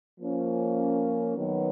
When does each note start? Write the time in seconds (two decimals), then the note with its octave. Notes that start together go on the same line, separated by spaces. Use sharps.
0.20 F3 A#3 C#4
1.36 D#3 F#3 B3